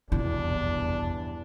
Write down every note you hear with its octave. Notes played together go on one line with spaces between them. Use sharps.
F1 A#1 E2 G2 B2 D4 E4